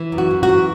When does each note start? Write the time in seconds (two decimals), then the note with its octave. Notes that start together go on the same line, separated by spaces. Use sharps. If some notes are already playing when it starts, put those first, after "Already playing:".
Already playing: E3
0.12 F#2
0.18 F#4
0.31 F#2
0.43 F#4
0.49 E3